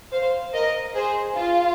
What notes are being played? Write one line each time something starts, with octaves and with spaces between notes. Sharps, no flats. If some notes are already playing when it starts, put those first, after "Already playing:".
C5 F5
A#4 D#5
G#4 C5
F4